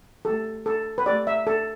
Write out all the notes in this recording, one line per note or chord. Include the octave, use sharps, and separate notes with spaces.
A3 G4 A4
A4
B4
A3 G4 D5
E5
A4